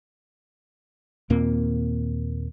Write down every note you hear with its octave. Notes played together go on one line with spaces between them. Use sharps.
D#2 A#2 A#3 C4